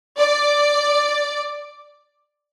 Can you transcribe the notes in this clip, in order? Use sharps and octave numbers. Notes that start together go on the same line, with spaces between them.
D5